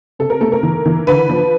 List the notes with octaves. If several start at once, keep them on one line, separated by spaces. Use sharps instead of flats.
C3 A4
A#4
A3 A4
A#4
E3
E3
D3 B4
F3